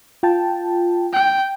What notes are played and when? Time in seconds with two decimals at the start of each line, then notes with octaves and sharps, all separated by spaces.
0.23 F4 G5 A5
1.13 G5